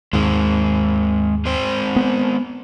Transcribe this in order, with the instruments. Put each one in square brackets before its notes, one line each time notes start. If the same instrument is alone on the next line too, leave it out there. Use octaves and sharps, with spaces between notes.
[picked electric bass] D#2 G#2 [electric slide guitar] G#3 C4
[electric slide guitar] G#3 C4 C5
[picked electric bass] B3